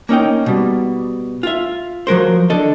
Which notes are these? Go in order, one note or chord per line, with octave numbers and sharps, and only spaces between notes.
A#3 C#4 D#4 G5
B2 G3
F4 E5
F3 F#3 A#4 C5
D3 A4 D#5